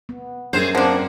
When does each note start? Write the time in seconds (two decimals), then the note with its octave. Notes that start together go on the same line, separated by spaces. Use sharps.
0.09 B3
0.53 F#2 C4 G#4 C5
0.75 F3 A#3 C4 D4 F#5